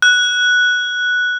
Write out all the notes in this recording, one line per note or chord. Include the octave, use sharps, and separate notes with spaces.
F#6